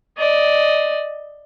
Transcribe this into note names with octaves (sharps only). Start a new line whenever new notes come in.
D5 D#5